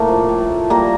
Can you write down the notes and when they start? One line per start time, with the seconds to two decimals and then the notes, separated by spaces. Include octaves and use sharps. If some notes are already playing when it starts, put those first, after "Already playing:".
Already playing: A2 A3 A#3 A#4
0.08 F3
0.29 A2
0.50 A3
0.70 G3 A#3 A#4